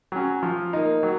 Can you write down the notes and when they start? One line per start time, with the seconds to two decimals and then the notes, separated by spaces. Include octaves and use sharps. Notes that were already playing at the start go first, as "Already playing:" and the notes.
0.12 F#3 C#4
0.43 F3
0.73 A#3 D#4
1.03 F#3